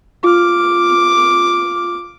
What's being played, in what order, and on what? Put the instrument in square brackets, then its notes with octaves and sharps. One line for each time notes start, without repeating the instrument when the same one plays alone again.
[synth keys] F4 F6 [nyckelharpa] D6